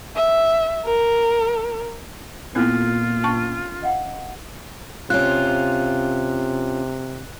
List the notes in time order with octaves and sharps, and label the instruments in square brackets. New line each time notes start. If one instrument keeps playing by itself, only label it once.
[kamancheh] E5
A#4
[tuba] A#2 [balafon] B3 C4 E4 [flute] F4 [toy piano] A4 B4
[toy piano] C#4 D4 B4 [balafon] A5 C#6
[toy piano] D#5 F5 F#5
[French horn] C3 [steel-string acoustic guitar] C#4 F4 [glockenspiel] F#6